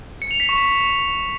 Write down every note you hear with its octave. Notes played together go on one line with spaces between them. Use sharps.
C#7
F7
B6
C#6
B6